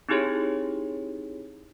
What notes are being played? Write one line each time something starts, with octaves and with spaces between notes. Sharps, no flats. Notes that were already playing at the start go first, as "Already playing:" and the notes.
C4 D#4 E4 G4 G#4 C#5